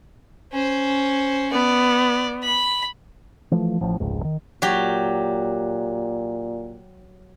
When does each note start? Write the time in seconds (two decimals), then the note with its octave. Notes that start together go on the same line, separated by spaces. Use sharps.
0.52 C#4 C5
1.52 B3 D5
2.43 B5
3.51 E3 F3 A3
3.81 A1 F3
4.00 F1 C#2 G#2
4.24 D#3
4.62 A#2 F#3 G4